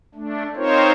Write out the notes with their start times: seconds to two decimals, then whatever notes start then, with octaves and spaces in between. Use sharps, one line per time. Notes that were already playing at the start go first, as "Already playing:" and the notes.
0.15 A3 D4
0.56 C4 D#4 F4 A#4 C5 C#5